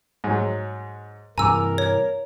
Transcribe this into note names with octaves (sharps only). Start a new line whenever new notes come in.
G#2 F#3
G2 C3 E3 A#4 G#5 A#5 D6 E6
C#5